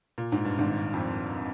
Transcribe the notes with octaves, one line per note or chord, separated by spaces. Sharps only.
A#2
G#2
G2
G#1 G#2
F2